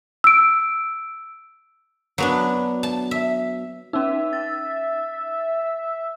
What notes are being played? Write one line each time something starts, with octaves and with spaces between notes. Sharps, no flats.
E6 D7
F#3 B3 D4
A5
E5
C#4 D#4 E5
A6